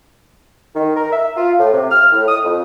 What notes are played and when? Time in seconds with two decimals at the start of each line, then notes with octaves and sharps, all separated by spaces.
0.75 D#3
0.96 A#4
1.12 E5
1.36 F4
1.59 A2
1.73 C3
1.91 F6
2.12 A2
2.28 D#6
2.44 F2